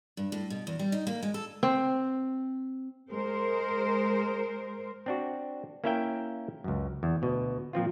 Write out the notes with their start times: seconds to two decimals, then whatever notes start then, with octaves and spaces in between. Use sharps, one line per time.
0.17 G2
0.32 A2
0.50 B2
0.67 E2
0.79 G3
0.92 D#4
1.07 A#3
1.23 G#3
1.34 A4
1.63 C4
3.11 G#3 A#4 C5
5.06 C4 D4 F#4
5.84 A#3 C#4 E4 A#4 E5 G5
6.64 C#2 F#2
7.03 E2
7.22 D2 B2
7.73 A#2 F3 C4 F4